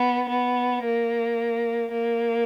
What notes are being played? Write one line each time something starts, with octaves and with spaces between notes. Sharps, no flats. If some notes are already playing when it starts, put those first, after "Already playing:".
Already playing: B3
B3
A#3
A#3